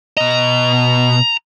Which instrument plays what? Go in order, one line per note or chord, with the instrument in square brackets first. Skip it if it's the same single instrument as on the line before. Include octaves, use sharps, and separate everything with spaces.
[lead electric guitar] B2 D#5 [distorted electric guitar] A#5